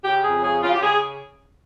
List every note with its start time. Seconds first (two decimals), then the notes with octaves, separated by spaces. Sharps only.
0.04 C#3 G4
0.24 F2 G#4
0.42 C#3 G#4
0.62 C#3 F4
0.73 G4
0.81 C#3 G#4